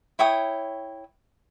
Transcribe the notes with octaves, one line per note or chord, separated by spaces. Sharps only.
E4 C#5 G5 D#6